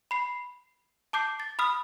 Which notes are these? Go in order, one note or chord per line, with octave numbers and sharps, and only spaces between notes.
B5 C7
A5 D6 G6 C7
A6
B5 D#6 F6